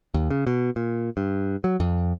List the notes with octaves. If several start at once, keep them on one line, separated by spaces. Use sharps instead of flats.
D#2
C#3
B2
A#2
G2
F#3
F2